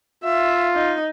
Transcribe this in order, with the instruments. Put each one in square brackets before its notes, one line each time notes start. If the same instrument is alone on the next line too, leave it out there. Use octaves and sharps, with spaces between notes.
[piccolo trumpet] F4 [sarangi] E5
[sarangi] D#4